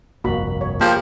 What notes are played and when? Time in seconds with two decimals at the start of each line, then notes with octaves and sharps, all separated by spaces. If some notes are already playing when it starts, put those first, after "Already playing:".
0.24 G1 C2 F2 A#3 F#4 B5
0.61 C#5
0.81 F3 A#3 G4 G#4